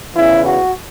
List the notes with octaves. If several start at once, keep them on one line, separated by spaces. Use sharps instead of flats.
E2 C#3 E3 E4
F#4